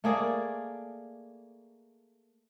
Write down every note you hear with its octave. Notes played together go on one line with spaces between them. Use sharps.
A3 A#3 G#4 D5